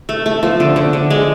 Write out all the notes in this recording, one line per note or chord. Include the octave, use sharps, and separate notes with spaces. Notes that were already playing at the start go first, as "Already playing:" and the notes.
A3
A3
F3
D3
D3
D3
G#3